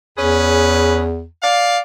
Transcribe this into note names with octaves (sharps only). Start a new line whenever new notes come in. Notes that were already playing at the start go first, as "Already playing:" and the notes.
E2 C#4 G#4 B4
D5 F5